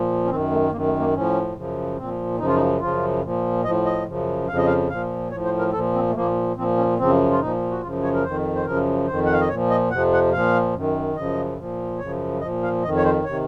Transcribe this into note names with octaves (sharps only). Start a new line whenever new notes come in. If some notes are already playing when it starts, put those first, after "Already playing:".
Already playing: A#2 F3
C#4
F#2 D#3 C4
A3
F#2 D#3 A#3
A3
A#3
A2 F3 C#4
F#2 C#3 F3
A#2 F3 C4
F#2 C#3 F3 D#4
F4
D#4
F#2 C#3 F3 F4
A#2 F3
A2 F3 D#5
D#5
F#2 C#3 F3
F2 C#3 F3 F5
D#5
F5
A#2 F3 F5
A2 F3 C#5
C5
A#4
A#2 F3 A4
C4
A3
A#2 F3 A#3
A#2 F3 C4
C#4
F#2 C#3 F3 C4
F4
A#2 F3 D#4
F#4
F#2 C#3 F3 F4
C#5
A#4
F2 D#3 C5
C5
F#2 C#3 F3 A#4
F2 D#3 C5
F#5
F5
D#5
A#2 F3 C#5
D#5
F2 C3 F3 F#5
F#5
A#2 F3 F5
F#2 D#3
F#2 C#3 F3 D#5
A#2 F3
F#2 C#3 F3 C#5
A#2 F3 D#5
F5
F2 D#3 D#5
C#5
C5
C3 D#3 C#5